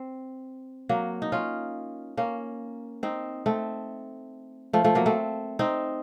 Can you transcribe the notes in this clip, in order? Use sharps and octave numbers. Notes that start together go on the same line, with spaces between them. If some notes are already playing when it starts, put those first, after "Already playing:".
Already playing: C4
F#3 A#3
D#4
C#4 F4
A#3 C#4
C4 D#4
A3 C4
F3 A3
F3 A3
F#3 A#3
A3 C4
C4 D#4